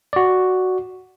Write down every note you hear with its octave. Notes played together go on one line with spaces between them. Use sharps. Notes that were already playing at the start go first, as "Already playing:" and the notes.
F#4 D5